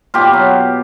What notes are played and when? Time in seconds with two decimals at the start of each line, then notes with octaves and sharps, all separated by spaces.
0.14 B2 F4 G4
0.33 F#3